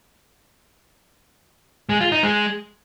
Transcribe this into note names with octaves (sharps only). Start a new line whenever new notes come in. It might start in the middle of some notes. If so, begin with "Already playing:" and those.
G#3
F4
D#4
G#3